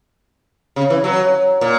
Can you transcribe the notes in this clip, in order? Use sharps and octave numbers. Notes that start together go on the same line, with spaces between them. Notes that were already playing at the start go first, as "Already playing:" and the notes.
C#3
E3
F#3
A#2